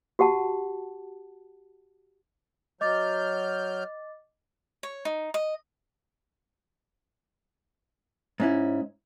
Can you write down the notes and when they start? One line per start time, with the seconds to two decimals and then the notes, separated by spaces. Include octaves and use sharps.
0.19 F#4 G4 F#5 A5
2.81 F#3 D#5 D6 F6 G6 A6
4.83 C#5
5.05 D#4
5.34 D#5
8.40 G#2 C#4 E4